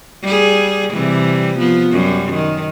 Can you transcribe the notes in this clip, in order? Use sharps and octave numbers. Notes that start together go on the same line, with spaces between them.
G3 G#4
C3 E3 G3
F3 B3
F#2 G3
D#3